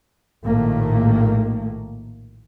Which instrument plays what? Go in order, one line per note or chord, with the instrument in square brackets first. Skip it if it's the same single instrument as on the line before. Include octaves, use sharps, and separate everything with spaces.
[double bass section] A#1 A2 D#3 A3 A#3